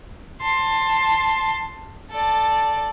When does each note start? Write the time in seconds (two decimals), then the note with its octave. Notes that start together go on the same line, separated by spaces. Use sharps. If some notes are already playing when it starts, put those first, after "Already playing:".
0.41 A5 C6
2.10 A4 D5